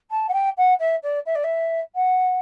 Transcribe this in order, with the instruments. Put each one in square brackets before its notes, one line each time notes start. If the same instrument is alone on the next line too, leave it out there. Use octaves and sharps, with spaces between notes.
[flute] A5
F#5
G5
F#5
E5
D5
E5
D5
E5
F#5